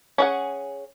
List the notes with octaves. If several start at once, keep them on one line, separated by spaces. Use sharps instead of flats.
C#4 G#4 F#5